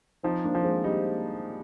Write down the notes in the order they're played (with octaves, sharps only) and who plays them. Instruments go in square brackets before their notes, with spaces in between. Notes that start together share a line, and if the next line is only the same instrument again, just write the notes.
[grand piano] F3 [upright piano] C4 D#4
[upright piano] A#3 D4
[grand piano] F3
[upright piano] G#3 C4
[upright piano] G3 A#3 [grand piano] D#4